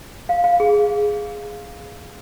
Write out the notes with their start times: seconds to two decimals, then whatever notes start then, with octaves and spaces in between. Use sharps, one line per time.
0.29 F5
0.44 F5
0.60 G#4